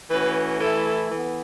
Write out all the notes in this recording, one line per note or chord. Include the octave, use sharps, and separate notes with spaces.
E3 A3 C#4 F#4 B4
E3 A3 E4 A4
E3 B3